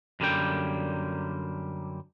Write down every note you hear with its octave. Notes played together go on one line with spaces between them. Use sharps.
F#2 D3 G3 A#3 G5